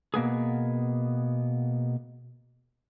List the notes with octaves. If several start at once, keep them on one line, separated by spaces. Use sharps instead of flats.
B2 A#3 B3 G#4